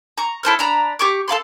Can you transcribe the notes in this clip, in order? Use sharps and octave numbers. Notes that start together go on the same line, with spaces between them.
A#5 C#6
E4 A4 C5 F6
D4 A#5 B5
G4 C#6 D6
A4 F5 B5 C6